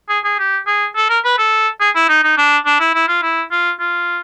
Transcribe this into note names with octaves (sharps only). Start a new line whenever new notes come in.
G#4
G#4
G4
G#4
A4
A#4
B4
A4
G#4
E4
D#4
D#4
D4
D4
E4
E4
F4
E4
F4
F4